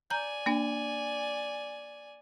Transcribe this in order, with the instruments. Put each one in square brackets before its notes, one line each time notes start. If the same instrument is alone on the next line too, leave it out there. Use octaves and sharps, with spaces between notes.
[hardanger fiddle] D5 G#5 [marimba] A#5 G6
[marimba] A#3 D4